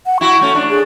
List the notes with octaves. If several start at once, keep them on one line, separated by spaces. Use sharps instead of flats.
F#5
E4 F#4 C#6
A3 C#4
D4
G#4